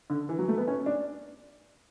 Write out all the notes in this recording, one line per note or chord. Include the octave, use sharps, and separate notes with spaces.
D3
E3
F#3
A3
B3
C#4
D4